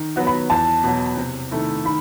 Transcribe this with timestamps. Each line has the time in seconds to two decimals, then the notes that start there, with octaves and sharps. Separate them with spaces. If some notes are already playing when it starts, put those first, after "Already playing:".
Already playing: D#3
0.16 F#3 B3 F#4
0.27 B5
0.50 E2 A5
0.84 B2 F#3
1.17 C3
1.51 D#3 A3 E4
1.85 D#3 B5